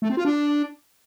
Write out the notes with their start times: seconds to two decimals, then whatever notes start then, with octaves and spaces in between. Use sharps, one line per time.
0.02 A3
0.10 C4
0.17 F4
0.25 D4